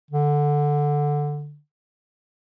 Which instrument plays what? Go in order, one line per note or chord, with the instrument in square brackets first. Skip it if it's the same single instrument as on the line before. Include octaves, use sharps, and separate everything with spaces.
[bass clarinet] D3